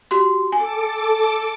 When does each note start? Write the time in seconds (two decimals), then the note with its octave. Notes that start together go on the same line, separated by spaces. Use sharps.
0.11 F#4 G4 C6
0.52 A4 G#5 D6